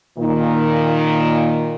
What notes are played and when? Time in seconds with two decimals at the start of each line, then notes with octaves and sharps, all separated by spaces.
0.18 A#2 D#3